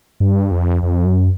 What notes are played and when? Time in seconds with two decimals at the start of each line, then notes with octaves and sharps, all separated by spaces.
0.20 G2
0.51 F2
0.83 F2
1.05 F#2